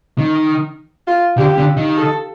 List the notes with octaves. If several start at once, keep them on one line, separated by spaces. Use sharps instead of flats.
D#3
F4
D3 G4
D3
D#3
A4